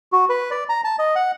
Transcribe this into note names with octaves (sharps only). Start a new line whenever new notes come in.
F#4
B4
D5
A#5
A5
D#5
F#5